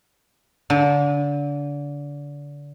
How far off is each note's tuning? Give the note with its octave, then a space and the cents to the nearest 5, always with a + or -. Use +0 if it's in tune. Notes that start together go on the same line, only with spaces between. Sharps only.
D3 -30